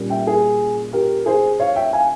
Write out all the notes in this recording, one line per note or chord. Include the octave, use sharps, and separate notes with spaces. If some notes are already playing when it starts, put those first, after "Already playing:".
Already playing: A#2 G3 A#3 C#4
E5 G5
G#4
G4 A#4
G#4 C5
C#5 F5
E5 G5
F5 G#5